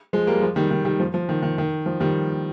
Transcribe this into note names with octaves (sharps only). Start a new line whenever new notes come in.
F3 G#3
G3 A#3
F3 G#3
D#3 G3
D#3
D#3 G3
F3
F3
D#3
D#3
D#3
F3
D#3 G3